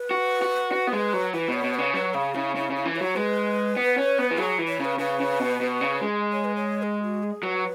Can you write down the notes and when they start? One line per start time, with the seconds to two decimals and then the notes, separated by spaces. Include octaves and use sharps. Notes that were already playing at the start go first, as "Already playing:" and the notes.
Already playing: B4
0.11 F#4
0.42 F#4
0.72 F#4
0.87 B3
0.93 G#3
1.13 F#3
1.33 E3 B4
1.48 B2 C#5
1.63 B2
1.74 C#3 B4
1.94 F#3 B4
2.14 C#3 G#4
2.35 C#3 E4
2.56 C#3 E4
2.70 C#3
2.75 E4
2.85 E3
2.96 C#5
3.01 F#3
3.16 G#3 B4
3.77 B3
3.98 C#4
4.18 B3
4.31 E3
4.38 F#3 G#4
4.58 E3
4.68 C#5
4.79 C#3
4.85 B4
4.99 C#3 B4
5.20 C#3
5.40 B2
5.61 B2
5.81 C#3
6.01 G#3
6.32 C#5
6.44 B4
6.56 C#5
6.82 G#4
7.03 F#4
7.23 G#4
7.43 F#3 B4